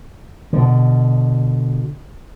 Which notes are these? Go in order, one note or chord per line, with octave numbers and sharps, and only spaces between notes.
B2 D3